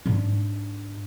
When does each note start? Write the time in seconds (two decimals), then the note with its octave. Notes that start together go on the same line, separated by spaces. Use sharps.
0.06 G#2 D4